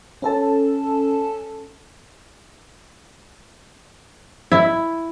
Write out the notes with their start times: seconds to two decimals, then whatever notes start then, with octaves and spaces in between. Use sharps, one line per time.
0.22 C#4 A4 A5
4.52 E4